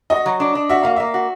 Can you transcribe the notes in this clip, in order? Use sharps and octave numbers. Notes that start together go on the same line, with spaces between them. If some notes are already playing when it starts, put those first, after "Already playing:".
F#4 D#5
F#3
D4
D4
F#4 E5
A#3 F5
A#3 E5
F#4